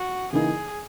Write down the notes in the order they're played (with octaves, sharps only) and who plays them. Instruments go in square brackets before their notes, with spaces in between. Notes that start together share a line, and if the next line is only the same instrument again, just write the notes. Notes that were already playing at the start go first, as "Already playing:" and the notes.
Already playing: [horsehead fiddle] F#4
[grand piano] C#3 E3 A#3 D#4 [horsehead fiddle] G#4